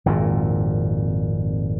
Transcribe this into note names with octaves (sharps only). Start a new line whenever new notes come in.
G#1 F2 A#2